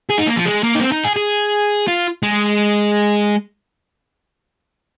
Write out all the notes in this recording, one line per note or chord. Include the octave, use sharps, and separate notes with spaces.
G#4
D#4
A#3
F3
G#3
A#3
D#4
C4
D#4
G#4
G#4
F4
G#3